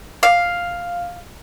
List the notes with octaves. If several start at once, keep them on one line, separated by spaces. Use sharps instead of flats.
F5